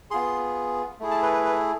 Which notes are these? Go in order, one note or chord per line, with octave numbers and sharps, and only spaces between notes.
B3 F4 G#4 C6
A3 E4 G#4
A5
B4
B4
B4